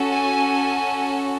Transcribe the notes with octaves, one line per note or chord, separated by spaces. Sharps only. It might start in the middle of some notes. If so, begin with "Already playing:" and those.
Already playing: C#4 F#4 A4
G#5